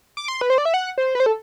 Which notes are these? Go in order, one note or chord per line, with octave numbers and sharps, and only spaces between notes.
D6
C6
B4
C5
D5
E5
F#5
C5
B4
C5
A4